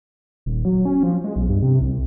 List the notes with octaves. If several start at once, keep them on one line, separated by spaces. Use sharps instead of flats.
D#1
F#3
C#4
F3
G#3
B1
G2
C3
C2